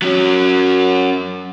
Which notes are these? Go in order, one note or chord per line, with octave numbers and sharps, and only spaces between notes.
F#3 C#4